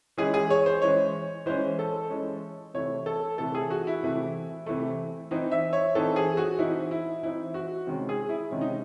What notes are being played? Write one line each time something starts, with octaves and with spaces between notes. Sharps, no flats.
E3 G#3 C#4 G#4
G#4
C#5
C5
E3 G#3 C#4 C#5
E3 G#3 C#4 C5
A4
E3 G#3 C#4
C3 E3 A3 C#5
A4
C3 E3 A3 A4
G#4
F#4
E4
C3 E3 A3
C3 E3 A3
E3 C4 D#4
E5
C#5
E3 C4 D#4 A4
G#4
F#4
E3 C4 D#4 E4
E4
E3 C4 D#4 E4
F#4
C3 D#3 G#3 C#4
G#4
E4
C3 D#3 G#3 C#4
D#4